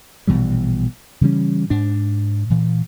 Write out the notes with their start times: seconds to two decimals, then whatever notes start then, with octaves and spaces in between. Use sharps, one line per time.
0.27 A#1 B2 E3 G3
1.21 C#3 E3 G3 C#4
1.70 G#2 D4
2.50 A#2 E3